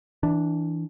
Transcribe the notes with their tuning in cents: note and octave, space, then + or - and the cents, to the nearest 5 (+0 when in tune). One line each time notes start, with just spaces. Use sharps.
E3 -15 D4 +0